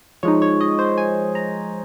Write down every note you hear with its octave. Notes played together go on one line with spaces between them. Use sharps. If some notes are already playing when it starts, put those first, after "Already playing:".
F3 G#3 D#4 C#5
C#5
D#5
C5
G#5
A#5